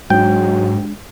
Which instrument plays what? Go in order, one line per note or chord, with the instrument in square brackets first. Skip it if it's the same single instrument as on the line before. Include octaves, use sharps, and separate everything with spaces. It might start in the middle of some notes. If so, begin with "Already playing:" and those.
[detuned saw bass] G#2 [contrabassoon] F#3 [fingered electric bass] G#3 D4 [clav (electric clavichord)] G5